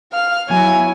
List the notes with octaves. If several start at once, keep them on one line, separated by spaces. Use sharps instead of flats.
F5 F6
F#3 B3 E4 C#5 G#5